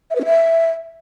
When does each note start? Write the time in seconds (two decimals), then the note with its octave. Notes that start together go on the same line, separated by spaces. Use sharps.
0.10 E5
0.15 B4
0.20 C#4
0.25 E5